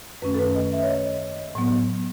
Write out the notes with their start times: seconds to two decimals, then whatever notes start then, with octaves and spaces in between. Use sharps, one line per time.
0.22 F#2 D#3 A3 C#4 B4
0.34 A4
0.39 B4
0.55 D#5
0.72 E5
0.83 C#5
0.89 D#5
1.55 A2 F#3 B3